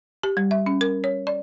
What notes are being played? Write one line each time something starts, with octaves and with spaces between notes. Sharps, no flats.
G4
G3
E5
C#4
A#4
C#5
D5